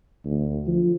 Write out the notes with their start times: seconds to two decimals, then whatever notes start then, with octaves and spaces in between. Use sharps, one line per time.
0.25 D2
0.67 F3